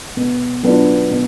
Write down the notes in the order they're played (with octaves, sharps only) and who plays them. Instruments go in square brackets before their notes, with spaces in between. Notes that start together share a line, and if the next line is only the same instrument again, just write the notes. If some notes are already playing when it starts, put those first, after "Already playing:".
[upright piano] B2
F#3 B3 D4 F4
B2